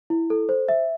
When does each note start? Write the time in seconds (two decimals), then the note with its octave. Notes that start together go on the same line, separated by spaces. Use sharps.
0.10 E4
0.30 A4
0.49 C5
0.69 E5